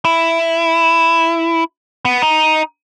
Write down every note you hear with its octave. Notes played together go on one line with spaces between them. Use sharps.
E4
B3
D#4